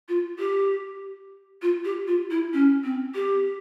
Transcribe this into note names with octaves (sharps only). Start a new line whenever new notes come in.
F4
G4
F4
G4
F4
E4
C#4
C4
G4